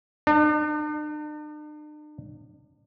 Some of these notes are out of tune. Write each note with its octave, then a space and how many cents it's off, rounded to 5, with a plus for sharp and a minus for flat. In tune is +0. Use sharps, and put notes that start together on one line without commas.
D4 +45